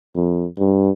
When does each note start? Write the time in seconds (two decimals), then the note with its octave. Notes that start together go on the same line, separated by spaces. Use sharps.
0.15 F2
0.59 G2